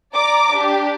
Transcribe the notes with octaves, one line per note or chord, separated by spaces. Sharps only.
D5 A#5 D6
D4 G4